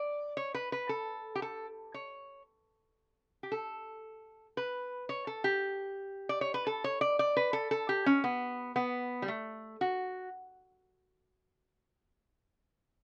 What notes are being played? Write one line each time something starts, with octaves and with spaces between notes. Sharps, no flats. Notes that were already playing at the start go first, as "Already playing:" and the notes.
Already playing: D5
C#5
B4
B4
A4
G4
A4
C#5
G4
A4
B4
C#5
A4
G4
D5
C#5
B4
A4
C#5
D5
D5
B4
A4
A4
G4
C#4
B3
B3
G3
A3
F#4